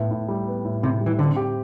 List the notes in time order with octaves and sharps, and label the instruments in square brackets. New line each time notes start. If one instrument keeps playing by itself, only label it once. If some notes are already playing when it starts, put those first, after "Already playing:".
Already playing: [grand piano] A2 B3
A2
G3
B3
A2
[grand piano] A2 [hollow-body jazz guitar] C3
[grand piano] G3
[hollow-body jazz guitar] E3
[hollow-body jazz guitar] D3 [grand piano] C4
[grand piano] G4